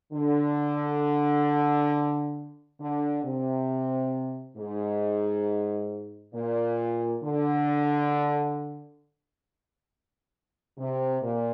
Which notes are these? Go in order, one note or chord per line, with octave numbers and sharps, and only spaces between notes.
D3
D3
C3
G#2
A#2
D3
C3
A#2